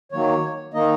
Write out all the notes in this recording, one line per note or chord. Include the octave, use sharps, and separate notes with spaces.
D#3 F#3 A#3 C#5
D#3 A#3 D#4 D#5